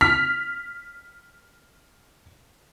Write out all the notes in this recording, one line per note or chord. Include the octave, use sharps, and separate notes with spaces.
F6 B6